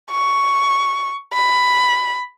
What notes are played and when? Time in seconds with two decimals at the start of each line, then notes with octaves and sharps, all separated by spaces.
0.11 C#6
1.33 B5